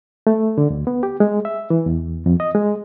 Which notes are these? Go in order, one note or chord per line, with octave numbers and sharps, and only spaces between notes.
A3
D3
D2
B3
G4
G#3
E5
E3
E2
F2
D#5
G#3